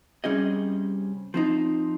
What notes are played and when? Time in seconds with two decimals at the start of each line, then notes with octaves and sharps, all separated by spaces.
0.24 C3 G3 C#4 G#4 D#5
1.34 F3 C4 D#4